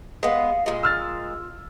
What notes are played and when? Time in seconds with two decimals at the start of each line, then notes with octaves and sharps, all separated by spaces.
0.23 G#3 B3 F5
0.66 A#2 G#3 F4
0.83 E6 F6 A6